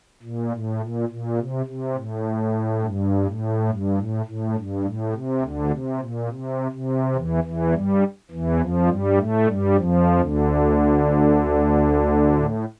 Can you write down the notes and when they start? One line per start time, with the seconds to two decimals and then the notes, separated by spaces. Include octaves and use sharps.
0.23 A#2
0.51 A2
0.80 A#2
1.09 A#2
1.37 C3
1.66 C3
1.95 A2
2.81 G2
3.25 A2
3.68 G2
3.97 A2
4.26 A2
4.56 G2
4.84 A2
5.13 C3
5.41 D2 D3
5.70 C3
5.99 A#2
6.28 C3
6.71 C3
7.15 E2 E3
7.43 E2 E3
7.73 G2 G3
8.31 E2 E3
8.59 F2 F3
8.88 G2 G3
9.17 A2 A3
9.46 G2 G3
9.76 F2 F3
10.18 D2 D3
12.35 A2